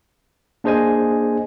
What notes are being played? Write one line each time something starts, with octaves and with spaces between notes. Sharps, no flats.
A#3 D4 G#4 C5 D#5 G#5